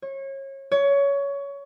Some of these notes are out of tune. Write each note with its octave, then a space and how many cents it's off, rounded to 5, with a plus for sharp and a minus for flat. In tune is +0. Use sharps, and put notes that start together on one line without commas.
C#5 -30
C#5 +20